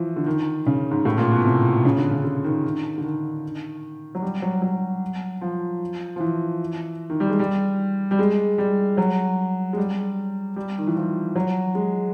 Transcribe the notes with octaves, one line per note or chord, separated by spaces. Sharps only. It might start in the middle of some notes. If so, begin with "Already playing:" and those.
Already playing: E3 F3
D3
D#3
C#3
G#2
A2
A#2
B2
C3
C#3
D3
C#3
D3
D#3
D3
D#3
F#3
G3
F#3
F#3
F3
F3
E3
D#3
G3
G#3
G3
G3
G#3
G3
F#3
G#3
G3
G3
D#3
E3
F3
F#3
G#3